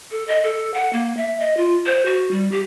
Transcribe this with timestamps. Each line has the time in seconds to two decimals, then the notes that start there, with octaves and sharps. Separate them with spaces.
0.11 A4
0.28 D#5
0.44 A4
0.74 F#5
0.93 A#3
1.17 E5
1.40 D#5
1.57 F4
1.86 C5
2.06 F#4
2.31 G3
2.52 G4